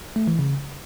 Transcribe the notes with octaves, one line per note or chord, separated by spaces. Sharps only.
A3
E3
C#3